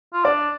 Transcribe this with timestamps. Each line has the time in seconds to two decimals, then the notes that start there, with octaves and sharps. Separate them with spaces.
0.13 F4
0.24 D4 D5